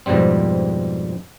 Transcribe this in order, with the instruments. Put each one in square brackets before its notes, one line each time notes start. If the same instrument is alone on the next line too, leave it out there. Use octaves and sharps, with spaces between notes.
[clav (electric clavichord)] F2 G#2 B2 G3 C4